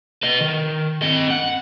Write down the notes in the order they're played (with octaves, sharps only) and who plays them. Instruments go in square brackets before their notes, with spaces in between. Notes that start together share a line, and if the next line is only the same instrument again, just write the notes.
[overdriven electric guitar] B4 D#5
D#3
C4 D#5
F#5